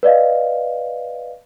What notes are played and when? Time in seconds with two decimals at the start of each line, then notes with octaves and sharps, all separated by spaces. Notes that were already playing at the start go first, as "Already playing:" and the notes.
0.03 B4 D5 D#5 F5